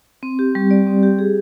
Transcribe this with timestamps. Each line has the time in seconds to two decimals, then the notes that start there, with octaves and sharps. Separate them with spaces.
0.23 C4
0.39 G4
0.55 G3
0.71 D5
0.87 C4
1.03 G4
1.19 G#4